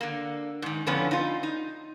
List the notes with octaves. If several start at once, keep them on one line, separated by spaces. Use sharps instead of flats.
D3 A#3
G#2 D#3
F2 A2 D3 F3 B3 C#4
D#4 F4
D#4